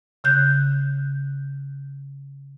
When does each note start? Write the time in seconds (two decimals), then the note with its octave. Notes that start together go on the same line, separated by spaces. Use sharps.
0.24 C#3 F#6 G6